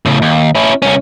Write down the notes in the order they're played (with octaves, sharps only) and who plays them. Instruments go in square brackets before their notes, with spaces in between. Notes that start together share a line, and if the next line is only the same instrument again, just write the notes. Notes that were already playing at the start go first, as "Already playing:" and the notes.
[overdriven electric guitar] A2 C#3
D#2
C#4 E4
C2 C#4